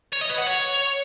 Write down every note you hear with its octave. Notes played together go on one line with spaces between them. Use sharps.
C#5
D#5
B4
F#5
C#5